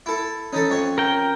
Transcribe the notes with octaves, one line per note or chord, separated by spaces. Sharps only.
E4 A4
E3 C#4 D#4 A4
F2 C#5
A#4 G5